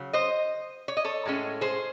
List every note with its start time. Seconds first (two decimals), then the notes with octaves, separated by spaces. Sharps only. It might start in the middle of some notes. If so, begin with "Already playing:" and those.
Already playing: C#3 F#3
0.13 C5 D#5
0.88 C#5
0.97 D#5
1.05 A4 C#5
1.25 A2 G#3 C#4
1.61 G#4 C5